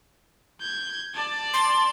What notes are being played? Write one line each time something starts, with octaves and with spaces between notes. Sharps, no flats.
G6 G#6
D5 A5
C6